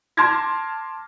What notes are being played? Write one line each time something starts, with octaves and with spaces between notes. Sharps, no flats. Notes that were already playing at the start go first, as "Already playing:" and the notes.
A5 C6 D6 F6 G#6 A#6